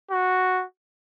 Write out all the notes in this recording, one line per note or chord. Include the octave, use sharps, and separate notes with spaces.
F#4